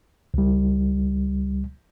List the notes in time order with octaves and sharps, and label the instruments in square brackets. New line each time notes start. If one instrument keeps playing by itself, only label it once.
[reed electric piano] C#2 G3